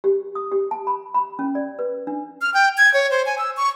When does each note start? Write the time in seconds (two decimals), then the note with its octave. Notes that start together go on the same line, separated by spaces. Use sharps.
0.04 G4
0.35 D#6
0.52 G4
0.71 A5
0.87 B5
1.14 B5
1.39 C#4
1.55 D5
1.79 B4
2.07 D4
2.41 F6
2.54 G5
2.78 G#6
2.94 C#5
3.11 C5
3.26 G#5
3.38 E6
3.57 C#6